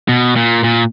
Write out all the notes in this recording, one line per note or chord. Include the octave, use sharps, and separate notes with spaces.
B2
A#2
A#2